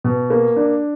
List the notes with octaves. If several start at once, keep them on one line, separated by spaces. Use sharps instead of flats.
B2
A#3
D4